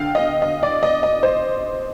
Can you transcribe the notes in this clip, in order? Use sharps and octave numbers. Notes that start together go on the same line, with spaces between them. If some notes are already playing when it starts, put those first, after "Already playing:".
Already playing: D3 F5 G5
D#5
D#5
D5
D#5
D#5
C5